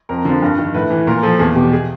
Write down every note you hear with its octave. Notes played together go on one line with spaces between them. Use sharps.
F2 A#4
D3 F3
G2
D#3
A2 B4
E3
A#2 A#4
F3 A4
E2 G#4
B2 G4
G#4